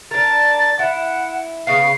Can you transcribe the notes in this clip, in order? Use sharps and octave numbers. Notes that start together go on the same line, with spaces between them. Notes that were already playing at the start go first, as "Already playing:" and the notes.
D4 A#4 A6
E4 F#5
C#3 B3 F5 C7